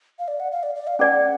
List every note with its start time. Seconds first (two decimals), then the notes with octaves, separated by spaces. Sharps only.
0.19 F5
0.28 D5
0.40 F#5
0.52 F5
0.63 D5
0.75 D5
0.87 F5
0.99 C#4 G#4 D5 F5 F#5 G#5